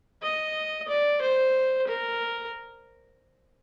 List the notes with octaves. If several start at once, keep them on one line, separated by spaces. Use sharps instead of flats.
D#5
D5
C5
A#4